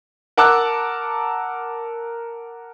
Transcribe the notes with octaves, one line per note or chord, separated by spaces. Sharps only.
A#4 F#5 A5 D6 E6 F#6